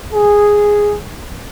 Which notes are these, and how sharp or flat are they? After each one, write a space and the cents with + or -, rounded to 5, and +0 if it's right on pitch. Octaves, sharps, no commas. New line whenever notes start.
G#4 -5